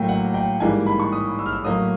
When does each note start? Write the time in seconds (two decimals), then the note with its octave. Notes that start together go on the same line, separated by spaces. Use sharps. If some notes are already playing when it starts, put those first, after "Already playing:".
Already playing: A2 F#3 A#3 G5
0.08 F#5
0.34 G5
0.60 G#2 E3 G3 A#3 G#5
0.87 B5
1.00 C#6
1.12 D#6
1.39 E6
1.46 F6
1.53 E6
1.64 A2 F#3 A#3 D#6